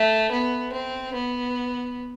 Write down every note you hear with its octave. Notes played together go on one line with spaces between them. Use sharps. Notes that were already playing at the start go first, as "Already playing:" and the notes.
Already playing: A3
B3
C4
B3